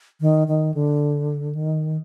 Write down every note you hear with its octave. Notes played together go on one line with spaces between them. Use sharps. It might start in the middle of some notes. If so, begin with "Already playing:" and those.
D#3
D#3
D3
D#3